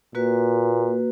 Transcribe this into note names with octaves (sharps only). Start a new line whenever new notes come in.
A#2 A#3 F#4 B4